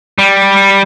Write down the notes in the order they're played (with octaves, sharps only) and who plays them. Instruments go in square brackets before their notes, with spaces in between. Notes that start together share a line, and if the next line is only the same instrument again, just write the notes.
[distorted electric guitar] G3